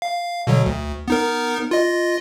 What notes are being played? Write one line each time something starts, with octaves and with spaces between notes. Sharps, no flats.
F5
B2 D3 F#3
D2
B3 D#4 A#4
F4 D#5